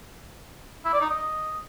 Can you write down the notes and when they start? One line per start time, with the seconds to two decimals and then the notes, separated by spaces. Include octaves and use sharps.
0.85 E4
0.93 D5
1.01 D#4
1.10 D#5